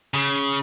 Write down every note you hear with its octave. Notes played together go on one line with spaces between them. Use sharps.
C#3